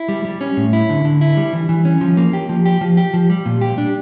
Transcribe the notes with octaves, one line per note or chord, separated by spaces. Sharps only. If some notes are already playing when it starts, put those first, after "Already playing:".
Already playing: E4
G3
G3
C#4
A2
E4
D3
D3
E4
G3
E3
E3
C#4
F3
A#3
G4
F3
G4
F3
G4
F3
G3
A#2
G4
D4